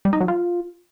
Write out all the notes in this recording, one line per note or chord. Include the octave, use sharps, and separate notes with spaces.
G3
D#4
F#3
F4